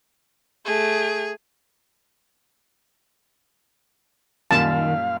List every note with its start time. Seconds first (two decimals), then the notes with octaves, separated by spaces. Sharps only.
0.65 A3 G#4
4.51 F#2 A#2 D#3 G3 F5 A5